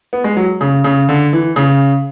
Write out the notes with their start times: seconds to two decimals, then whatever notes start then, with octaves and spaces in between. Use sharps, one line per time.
0.13 B3
0.24 G#3
0.37 F#3
0.61 C#3
0.84 C#3
1.09 D3
1.33 E3
1.56 C#3